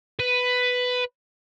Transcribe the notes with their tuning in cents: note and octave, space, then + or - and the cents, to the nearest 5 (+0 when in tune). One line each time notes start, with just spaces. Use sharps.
B4 +10